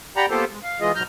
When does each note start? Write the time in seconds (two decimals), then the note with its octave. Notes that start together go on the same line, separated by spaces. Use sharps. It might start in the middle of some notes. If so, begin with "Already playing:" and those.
0.17 G4 D5 F#5 G5 A#5 B5
0.30 A#3 B3 F4 G4 A4 C5
0.51 G#3
0.63 F5
0.81 E3 G#3 F4 G#4 D#5
0.95 G#2 B2 F#3 A#5 F6 G6